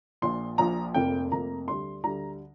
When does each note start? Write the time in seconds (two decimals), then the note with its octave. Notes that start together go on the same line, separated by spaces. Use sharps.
0.22 A#1 A#2 F3 C6
0.58 A#1 A#2 F3 A#5
0.94 F1 F2 C3 A#3 G5
1.31 F1 F2 C3 A#3 A#5
1.67 D2 D3 G3 C6
2.04 D2 D3 G3 A#5